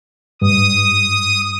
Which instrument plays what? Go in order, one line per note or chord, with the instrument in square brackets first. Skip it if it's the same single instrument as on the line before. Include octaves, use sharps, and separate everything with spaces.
[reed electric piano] G2 [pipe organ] D#6